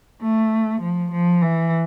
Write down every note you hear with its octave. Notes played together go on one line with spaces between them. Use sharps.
A3
F3
F3
E3